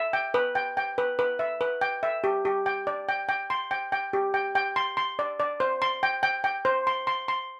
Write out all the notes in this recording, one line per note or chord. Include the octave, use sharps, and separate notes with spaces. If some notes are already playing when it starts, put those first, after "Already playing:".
Already playing: E5
G5
B4
G5
G5
B4
B4
E5
B4
G5
E5
G4
G4
G5
D5
G5
G5
C6
G5
G5
G4
G5
G5
C6
C6
D5
D5
C5
C6
G5
G5
G5
C5
C6
C6
C6